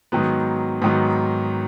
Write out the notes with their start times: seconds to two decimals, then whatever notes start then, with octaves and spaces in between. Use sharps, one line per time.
0.12 G#2 D#3 F#3 B3
0.82 G#2 D#3 F#3 B3